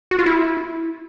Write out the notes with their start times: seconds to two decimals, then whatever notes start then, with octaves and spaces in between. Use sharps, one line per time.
0.11 F#4
0.19 F4
0.26 E4